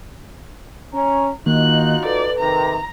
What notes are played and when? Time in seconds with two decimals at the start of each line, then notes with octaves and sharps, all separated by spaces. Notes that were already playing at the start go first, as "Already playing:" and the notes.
0.93 C#4 A#5
1.46 D#3 A#3 D#4 F4 F#4 D#5 F#6
2.06 A4 B4 D5
2.39 C3 D#3 A#5